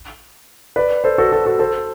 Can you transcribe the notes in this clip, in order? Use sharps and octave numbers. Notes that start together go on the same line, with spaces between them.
B4 D5
A4 C5
F#4 A4
F#4 A4
F#4 A4
A4 C5